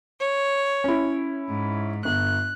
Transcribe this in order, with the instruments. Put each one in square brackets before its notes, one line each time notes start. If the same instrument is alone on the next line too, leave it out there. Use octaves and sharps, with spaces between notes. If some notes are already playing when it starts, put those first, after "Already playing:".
[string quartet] C#5
[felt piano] C#4 E4
[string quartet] G#2
[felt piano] G1 [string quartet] F#6